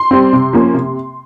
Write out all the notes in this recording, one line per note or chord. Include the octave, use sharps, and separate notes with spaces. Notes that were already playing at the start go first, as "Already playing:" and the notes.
Already playing: C6
G3 C4
C3
F3 A#3 C#4
C3